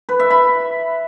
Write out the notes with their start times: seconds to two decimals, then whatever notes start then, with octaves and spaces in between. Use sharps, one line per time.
0.09 B4
0.20 E5
0.30 B5